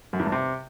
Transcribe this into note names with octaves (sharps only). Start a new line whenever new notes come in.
F#2
E2
G2
C3